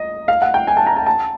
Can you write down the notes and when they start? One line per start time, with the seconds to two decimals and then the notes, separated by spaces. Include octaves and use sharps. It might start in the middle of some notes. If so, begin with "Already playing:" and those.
Already playing: D#5
0.28 F5
0.42 F#5
0.54 G5
0.67 G#5
0.77 A5
0.87 A#5
0.96 A5
1.06 A5